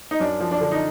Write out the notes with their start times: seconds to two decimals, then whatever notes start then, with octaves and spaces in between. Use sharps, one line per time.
0.11 D#4
0.20 F#2 D4
0.40 F3
0.51 D4
0.61 D3
0.72 D#4